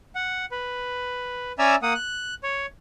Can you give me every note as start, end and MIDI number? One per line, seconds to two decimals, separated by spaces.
0.15 0.45 78
0.52 1.52 71
1.59 1.75 61
1.59 1.75 74
1.59 1.75 76
1.59 1.75 80
1.59 1.75 82
1.59 1.75 88
1.83 1.94 58
1.83 1.94 78
1.83 1.94 87
1.95 2.34 90
2.43 2.66 73